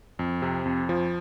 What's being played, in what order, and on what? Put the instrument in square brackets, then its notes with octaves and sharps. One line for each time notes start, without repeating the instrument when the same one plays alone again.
[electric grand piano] F2
C3
F2
F3